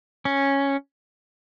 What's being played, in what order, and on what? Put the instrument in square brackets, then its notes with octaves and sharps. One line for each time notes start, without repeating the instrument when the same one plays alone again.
[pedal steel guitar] C#4